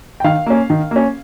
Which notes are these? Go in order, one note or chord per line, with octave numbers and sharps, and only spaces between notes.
G5
D#3 F5
A#3 C#4
D#3
A#3 C#4